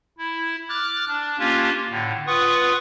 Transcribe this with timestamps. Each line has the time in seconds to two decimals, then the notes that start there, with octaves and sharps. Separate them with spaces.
0.18 E4
0.69 D6 F6 F#6 A6
1.08 D4
1.39 A#3 C#4 D4 F4 G4
1.90 A2 D3
2.27 F4 B4 F#5 C#6 D#6